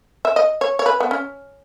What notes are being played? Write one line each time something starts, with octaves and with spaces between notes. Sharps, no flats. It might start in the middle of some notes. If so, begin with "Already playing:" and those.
E5
D#5
C#5
C#5
B4
B3
C#4